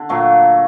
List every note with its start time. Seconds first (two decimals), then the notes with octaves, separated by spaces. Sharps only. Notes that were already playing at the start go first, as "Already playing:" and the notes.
Already playing: D3
0.09 A#2 F#3 A3